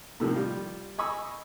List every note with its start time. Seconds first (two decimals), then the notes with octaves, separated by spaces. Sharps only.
0.20 A2 C3 D#3 F3 A#3
0.36 G3 F4
0.98 D#5 G#5 B5 C#6 D#6 E6